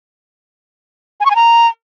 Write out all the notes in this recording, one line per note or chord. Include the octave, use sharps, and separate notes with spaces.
G#5
C#6
G#5
A#5